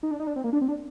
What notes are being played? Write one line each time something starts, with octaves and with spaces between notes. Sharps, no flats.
D#4
D4
D#4
D4
C4
A#3
D4
C4
D4